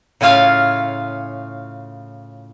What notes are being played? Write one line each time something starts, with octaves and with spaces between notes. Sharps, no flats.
A2 C#3 C#4 F4 F5 G#5